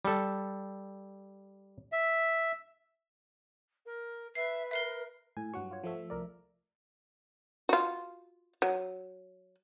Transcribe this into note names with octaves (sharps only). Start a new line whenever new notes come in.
G3 A4
E5
A#4
B4 E5 C7
A#4 E5 C7 G7
A2 G#5
G2 F#3 F#5 C#6
F4 C#5
F3 A3 E5
C2 A#4 D5
F4 F#4
F#3